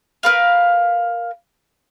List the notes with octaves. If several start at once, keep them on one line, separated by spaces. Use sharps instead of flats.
A#4 B4 F5